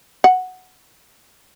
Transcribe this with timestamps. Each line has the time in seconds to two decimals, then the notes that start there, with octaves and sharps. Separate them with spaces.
0.24 F#5